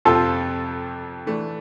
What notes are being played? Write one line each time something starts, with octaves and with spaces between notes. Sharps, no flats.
F2 C3 F3 F4 A4
E3 A3 D4